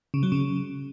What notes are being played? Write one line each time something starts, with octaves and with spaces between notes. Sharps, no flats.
C#3
F#3
C#3